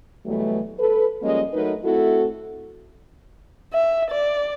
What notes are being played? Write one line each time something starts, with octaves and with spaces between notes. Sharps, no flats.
B2 E3 F#3 G3 A3
A4 B4
F3 G3 G#3 A#3 C#4 D#5
F#3 A3 D#4 A#4 B4
A3 C4 E4 F#4 A4
E5
D5